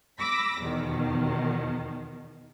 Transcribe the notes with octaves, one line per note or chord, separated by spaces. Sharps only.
B5 D6 E6 A#6
E2 B2 D#3